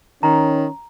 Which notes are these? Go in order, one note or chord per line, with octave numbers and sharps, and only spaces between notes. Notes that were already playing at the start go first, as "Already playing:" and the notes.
D#3 C#4 A#5